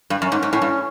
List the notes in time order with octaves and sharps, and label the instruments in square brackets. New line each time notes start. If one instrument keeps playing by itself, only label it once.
[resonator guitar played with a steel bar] G2
[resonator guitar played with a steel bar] F#2 [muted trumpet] C#4
[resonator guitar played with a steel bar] G#2
G#2
[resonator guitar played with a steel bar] A2 [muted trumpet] C#4
[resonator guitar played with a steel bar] G2